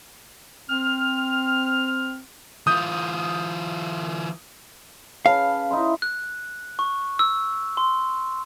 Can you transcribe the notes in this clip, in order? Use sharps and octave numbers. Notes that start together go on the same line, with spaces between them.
C4 F6
E3 F4 D#6 G6
C#3 B4 F5 A5
D#4 E4 C6
F#6
C#6
E6
C6